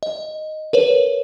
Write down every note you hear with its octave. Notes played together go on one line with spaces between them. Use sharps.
D#5
A#4 B4 C#5